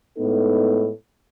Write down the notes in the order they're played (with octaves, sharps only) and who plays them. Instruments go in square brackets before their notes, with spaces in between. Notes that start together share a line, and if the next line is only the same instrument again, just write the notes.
[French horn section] A2 G#3 B3 D#4 A4